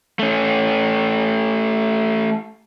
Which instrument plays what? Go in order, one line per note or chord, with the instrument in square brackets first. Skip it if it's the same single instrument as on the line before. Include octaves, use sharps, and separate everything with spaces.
[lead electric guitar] A3 C#4